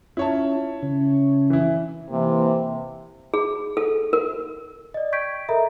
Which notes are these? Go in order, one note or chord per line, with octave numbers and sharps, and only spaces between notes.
C#4 E4 F4 C#5 A5
C#3 C#4
E3 E4
C3 E3 A#3
G#4
A4
A#4
D5 D#5
G5 C#6 G6 G#6 B6 D7
A4 A#4 D#5 E5 A#5 B5